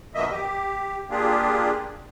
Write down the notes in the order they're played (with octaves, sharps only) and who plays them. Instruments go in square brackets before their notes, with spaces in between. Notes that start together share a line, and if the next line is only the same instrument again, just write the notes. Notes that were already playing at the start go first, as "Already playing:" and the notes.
[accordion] F2 B2 D3 A#3 D#5 E5
G4
A#3 D4 F4 G4 G#4